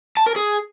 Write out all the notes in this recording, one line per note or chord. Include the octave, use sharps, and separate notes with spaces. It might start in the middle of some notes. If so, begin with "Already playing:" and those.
A5
A#4
G#4